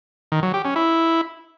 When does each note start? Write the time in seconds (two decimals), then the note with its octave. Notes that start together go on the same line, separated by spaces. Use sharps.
0.32 D#3
0.43 F#3
0.54 G4
0.65 C#4
0.76 E4